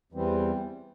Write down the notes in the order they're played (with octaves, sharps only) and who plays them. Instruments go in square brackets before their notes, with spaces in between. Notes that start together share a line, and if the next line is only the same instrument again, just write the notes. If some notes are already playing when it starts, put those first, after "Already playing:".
[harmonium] E2 E3 G3 C4